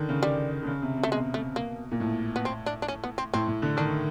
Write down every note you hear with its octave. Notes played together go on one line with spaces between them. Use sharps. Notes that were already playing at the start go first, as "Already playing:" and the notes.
Already playing: D3 D#3
C#3
G3
D3
C#3
C3
C3
A3
B2 G#3
A3
A#3
A#2
A2
B3
C4
D4
D4
C#4
B3
C4
A2 C4
A2
D3
D#3 D4